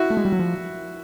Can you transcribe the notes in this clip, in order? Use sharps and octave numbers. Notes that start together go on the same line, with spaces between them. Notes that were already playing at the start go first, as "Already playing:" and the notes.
Already playing: E4 F#4
A3
G#3
G3
F#3
F3